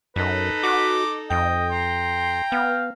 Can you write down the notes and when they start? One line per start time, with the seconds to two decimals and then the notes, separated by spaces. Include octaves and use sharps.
0.16 F#2 D#4 A4 B4
0.63 F#4 D6
1.31 F2 D#5 G5
1.72 A#5 C6
2.52 B3 F5